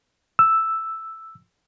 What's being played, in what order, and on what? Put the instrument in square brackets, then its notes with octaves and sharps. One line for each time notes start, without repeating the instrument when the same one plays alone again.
[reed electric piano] E6